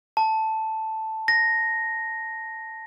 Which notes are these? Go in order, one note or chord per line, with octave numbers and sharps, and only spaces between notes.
A5
A#6